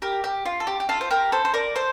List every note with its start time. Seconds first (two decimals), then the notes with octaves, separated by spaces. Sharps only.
0.02 G4 A#4
0.24 G4
0.45 F4
0.60 A4
0.67 G4
0.80 G4
0.89 F4 A4
1.01 C5
1.11 G4 A#4
1.32 A4 C5
1.45 C5
1.54 A#4 D5
1.76 A4 C5